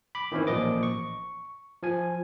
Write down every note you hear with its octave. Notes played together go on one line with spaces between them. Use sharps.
B5 D6
D#3 E3 C4 C#4 E4
A1 A#2 F3 D#5 D6
C#6
F3 G#5